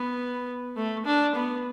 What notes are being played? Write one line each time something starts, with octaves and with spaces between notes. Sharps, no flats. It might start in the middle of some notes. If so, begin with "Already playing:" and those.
Already playing: B3
A3
D4
B3